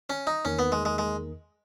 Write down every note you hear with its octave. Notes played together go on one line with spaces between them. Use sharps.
C#4
D#4
E2 D#3 A#3 C#4 D#4 A#4
B3
G#3
G#3
G#3